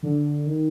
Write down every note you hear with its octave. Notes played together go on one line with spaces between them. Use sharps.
D3
D#3